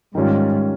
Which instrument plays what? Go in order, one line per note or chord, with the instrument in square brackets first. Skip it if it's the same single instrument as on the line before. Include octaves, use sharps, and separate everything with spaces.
[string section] G#2 [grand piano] D#3 G3 C#4 F4